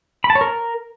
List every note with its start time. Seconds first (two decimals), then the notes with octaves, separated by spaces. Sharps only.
0.24 B5
0.30 A5
0.35 C#5
0.41 A#4